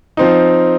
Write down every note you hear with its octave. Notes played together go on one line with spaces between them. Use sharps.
F3 C4 D#4